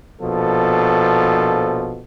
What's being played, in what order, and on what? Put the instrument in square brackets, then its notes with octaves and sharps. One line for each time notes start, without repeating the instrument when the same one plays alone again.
[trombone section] A#1 B2 F3 A4